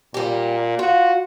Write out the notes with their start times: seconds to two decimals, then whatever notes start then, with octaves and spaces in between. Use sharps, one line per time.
0.14 A#2 G3 G4
0.79 F4 F#4